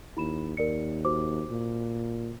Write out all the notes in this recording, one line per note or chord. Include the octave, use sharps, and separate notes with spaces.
D#2 E4 B5 E7
D#2 A#4 D5 C#7
F#4 C5 D6
A#2